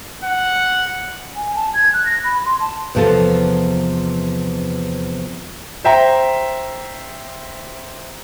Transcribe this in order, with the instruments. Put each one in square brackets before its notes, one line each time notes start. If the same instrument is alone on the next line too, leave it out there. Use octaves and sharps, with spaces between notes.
[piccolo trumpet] F#5
[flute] G#5
A5
G#6
F#6
A#6
B5
C6
A5
[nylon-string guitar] E2 C3 F3 B3 A4
[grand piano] C5 E5 G5 A#5